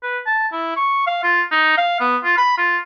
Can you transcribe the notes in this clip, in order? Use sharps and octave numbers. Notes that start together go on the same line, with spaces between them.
B4
A5
E4
C#6
F5
F4
D#4
F5
B3
F4
B5
F4